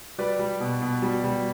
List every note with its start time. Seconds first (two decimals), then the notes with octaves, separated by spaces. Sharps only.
0.18 G3 B4 D5
0.39 G3
0.60 B2
0.82 B2
1.02 G3
1.24 G3